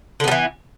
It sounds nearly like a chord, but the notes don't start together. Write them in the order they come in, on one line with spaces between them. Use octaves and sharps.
D3 B3 G3 E3